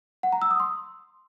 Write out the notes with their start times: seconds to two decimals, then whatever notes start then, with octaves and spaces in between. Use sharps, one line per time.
0.23 F#5
0.32 A#5
0.42 E6
0.51 D#6
0.60 C6